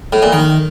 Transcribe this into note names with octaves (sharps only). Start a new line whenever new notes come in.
A2
A#2
D#3